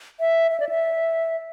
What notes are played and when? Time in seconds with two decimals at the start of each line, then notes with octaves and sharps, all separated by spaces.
0.20 E5
0.51 E5
0.60 D5
0.69 E5